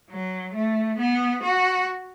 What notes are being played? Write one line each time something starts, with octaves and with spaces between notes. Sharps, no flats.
F#3
A3
B3
F#4